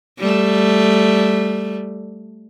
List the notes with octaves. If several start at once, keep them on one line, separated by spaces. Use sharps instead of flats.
G3 A3